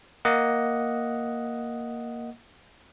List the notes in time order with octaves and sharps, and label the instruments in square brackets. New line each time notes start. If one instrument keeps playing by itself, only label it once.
[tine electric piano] A#3 D#5 F#5